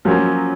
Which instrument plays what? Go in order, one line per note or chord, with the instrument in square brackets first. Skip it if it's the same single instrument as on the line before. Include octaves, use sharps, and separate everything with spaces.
[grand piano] F3 A#3 C#4 [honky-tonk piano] F#3